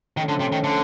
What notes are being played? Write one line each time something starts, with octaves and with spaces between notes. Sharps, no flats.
D#3 F3 A3 C#4
D3
C3
D#3
D3